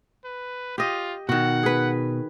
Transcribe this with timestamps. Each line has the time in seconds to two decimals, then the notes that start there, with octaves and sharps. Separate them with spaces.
0.24 B4
0.78 F4 G4 D#5
1.29 B2 D#3 F#4 F#5
1.63 G#4 B4